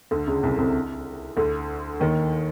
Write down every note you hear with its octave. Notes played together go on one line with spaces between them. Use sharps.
D2 D3
C#2 C#3
C2 C3
C2 C3
D2 D3
D#2 D#3